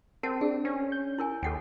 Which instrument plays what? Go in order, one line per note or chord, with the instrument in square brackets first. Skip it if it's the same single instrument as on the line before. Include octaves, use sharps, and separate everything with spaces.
[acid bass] C4 [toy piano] A#4 F#5 A5
[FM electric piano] D4 [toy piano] G#4
[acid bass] C#4
[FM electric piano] G6
[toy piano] E4 A#4 G#5
[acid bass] D#2 [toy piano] A4 F#5 G5